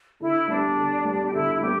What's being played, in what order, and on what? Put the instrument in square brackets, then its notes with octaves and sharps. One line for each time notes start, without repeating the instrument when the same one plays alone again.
[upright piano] D3 [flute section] E4
[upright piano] G3 B3 [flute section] D4
[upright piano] D3
G3 B3
[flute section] G4
[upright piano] D3 [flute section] E4
[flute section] E4
[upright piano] G3 B3 [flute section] G4